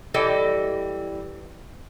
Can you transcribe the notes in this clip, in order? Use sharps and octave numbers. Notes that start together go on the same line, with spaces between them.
E3 G3 A4 D#5 G5